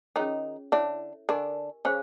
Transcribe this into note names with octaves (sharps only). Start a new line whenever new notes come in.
D#3 C#4 D#4 F4 G#4 C#5
D3 D4 E4 A4 C#5 E5
D3 D4 G4 A#4 D#5 G#5
C#3 C#4 G#4 C5 F5